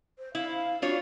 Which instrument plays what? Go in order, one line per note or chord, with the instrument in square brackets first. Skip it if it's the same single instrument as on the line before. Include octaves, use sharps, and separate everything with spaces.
[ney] C5
[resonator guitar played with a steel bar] E4 [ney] F5
[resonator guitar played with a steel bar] D4 F4 C#5 [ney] F#4